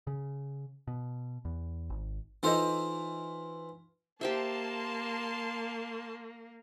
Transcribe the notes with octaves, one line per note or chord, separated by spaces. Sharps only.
C#3
B2
E2
G#1
E3 D#4 F4 A4 C5 D#5
A#3 G4 C5 E5 A5 C6